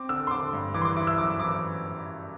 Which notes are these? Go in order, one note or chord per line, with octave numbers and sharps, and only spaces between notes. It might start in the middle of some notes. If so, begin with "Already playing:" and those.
Already playing: C4 D6
D3 E6
C6
D3 D6
G2
E3 D6
C6
D6
E4 D6
E6
F#2 D6
E3 D6